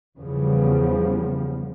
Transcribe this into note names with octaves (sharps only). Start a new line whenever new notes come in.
E2 C#3 F3 G3 B3